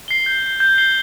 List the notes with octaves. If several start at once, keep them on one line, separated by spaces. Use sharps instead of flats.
C7 G7
G6
C7 G7
G6
C7 G7